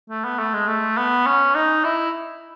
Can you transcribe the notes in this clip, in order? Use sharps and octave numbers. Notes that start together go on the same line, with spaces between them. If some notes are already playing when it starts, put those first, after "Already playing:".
A3
B3
A3
G#3
A3
B3
C#4
D#4
E4